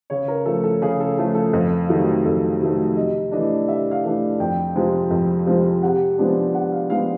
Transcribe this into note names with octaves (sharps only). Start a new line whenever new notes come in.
C#3 C#5
A#4
F3 A3 A4
A4
C#3 G#4
A4
F3 A3 A4
A4
F2
C3 D#3 F#3 A3
F2 A4
C3 D#3 F#3 A3
C3 D#5
E3 A3 D4 D#5
C3 E5
F5
E3 A3 D4
F2 G5
C3 F3 G#3 C4
F2
C3 F3 G#3 C4
C3 F#5
F3 G#3 B3 D4
C3 F#5
F5
F3 G#3 B3 D4 F5